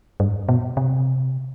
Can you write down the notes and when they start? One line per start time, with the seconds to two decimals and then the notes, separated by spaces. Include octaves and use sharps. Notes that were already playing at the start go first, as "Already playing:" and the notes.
0.20 G2
0.49 B2
0.77 C3